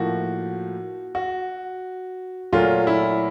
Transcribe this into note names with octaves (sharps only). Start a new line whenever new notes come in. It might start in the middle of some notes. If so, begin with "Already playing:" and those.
Already playing: A2 F3 A#3 F#4
F#4
A#2 F#3 A3 F4
E4